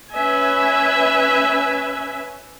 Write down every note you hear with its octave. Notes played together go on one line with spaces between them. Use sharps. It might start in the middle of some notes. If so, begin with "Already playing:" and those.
C#4 B4 E5 G#5